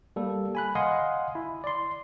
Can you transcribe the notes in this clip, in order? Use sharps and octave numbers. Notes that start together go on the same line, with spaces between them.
G3 A#3 A4
G#5 B5 F#6
D#5 F5 F#5 G#5 C6 D#6
E4
D5 C6